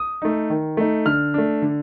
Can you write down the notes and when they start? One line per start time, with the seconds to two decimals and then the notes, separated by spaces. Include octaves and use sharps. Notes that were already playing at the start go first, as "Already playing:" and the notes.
Already playing: D#6
0.22 A3 D#4
0.50 D#3
0.77 A3 D#4
1.06 D3 F6
1.34 A3 D4
1.62 D3